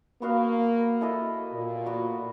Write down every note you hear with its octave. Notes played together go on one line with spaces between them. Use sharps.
A#3 B3 F#4 F5
E4 A4 D#5
A#2
B3 F#4